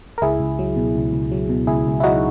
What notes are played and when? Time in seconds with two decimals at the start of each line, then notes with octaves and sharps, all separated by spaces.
0.18 A#4
0.22 C#2 E4 G#4
0.40 C#2
0.59 F#3
0.76 B2
0.95 C#2
1.13 C#2
1.32 F#3
1.49 B2
1.67 C#2 E4 G#4
1.86 C#2
2.00 E4
2.04 F#3 D#4 F#4